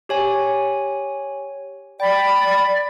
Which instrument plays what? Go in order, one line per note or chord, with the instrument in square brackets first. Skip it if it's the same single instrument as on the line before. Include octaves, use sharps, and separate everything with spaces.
[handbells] G4 C#5 G#5
[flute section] D5 B5 [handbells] G5